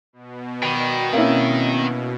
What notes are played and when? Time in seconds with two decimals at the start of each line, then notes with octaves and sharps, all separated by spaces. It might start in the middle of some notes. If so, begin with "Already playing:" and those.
0.13 B2
0.63 D#3 G5 B5
1.13 A#3 C4 C#4 E4